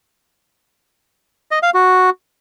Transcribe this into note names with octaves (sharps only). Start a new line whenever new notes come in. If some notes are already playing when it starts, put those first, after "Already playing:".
D#5
F5
F#4